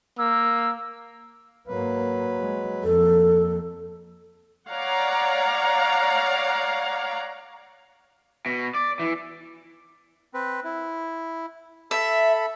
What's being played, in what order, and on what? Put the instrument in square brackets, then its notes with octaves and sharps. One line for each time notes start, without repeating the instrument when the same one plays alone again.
[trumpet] A#3 [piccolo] E6
[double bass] G#2 A#3 [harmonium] F#3 B4
[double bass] G#3
[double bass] F2 A#3 [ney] A4
[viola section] C#5 D5 F5 F#5 A#5
[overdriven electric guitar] B2
D5
E3
[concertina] C4 B4
E4
[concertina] A4 B5 [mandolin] E5